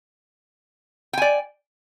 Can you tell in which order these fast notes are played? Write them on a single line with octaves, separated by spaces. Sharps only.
G5 G#5 D5